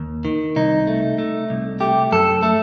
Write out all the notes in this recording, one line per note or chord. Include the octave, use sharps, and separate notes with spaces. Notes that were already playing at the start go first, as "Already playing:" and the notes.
Already playing: D#2
D#3
C2 D#4
A3
A3
C2
A3 G4
F#2 A4
A3 A4